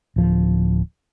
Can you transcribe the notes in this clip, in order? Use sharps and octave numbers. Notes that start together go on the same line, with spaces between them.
D1 F3